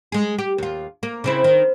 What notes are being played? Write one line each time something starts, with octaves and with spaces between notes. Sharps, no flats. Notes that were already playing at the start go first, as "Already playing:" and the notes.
G#3 G#4
G4
D#2 F4
A#3
C#3 C4 E4
D#3